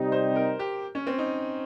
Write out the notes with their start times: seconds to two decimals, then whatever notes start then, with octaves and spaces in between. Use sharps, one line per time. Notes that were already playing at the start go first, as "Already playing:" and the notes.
Already playing: C3 G3 C4 D#4
0.12 C5
0.36 A#4
0.59 G4
0.95 C#4
1.07 C4
1.18 D#4